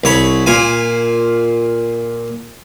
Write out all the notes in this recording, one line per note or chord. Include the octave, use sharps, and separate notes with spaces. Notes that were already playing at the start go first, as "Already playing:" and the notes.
C2 C#5 B5
A#2 F4 G#5